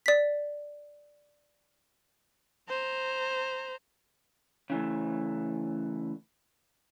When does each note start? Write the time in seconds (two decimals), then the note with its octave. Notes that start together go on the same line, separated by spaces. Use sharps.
0.06 D5 B6
2.69 C5 A#5
4.70 C#3 E3 A3